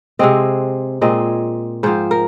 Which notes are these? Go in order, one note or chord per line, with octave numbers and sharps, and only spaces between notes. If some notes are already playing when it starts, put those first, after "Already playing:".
C3 G#3 C4 D#5
A#2 G#3 C4 D#5
G#2 F3 C4 C5
A#4